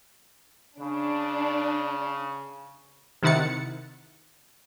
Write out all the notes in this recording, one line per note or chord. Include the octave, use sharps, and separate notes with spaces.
C#3 D4
C3 D#3 E4 F#5 A6 C#7